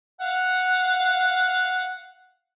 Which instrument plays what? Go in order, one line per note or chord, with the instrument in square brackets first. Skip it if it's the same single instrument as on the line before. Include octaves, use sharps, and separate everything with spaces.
[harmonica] F5 F#5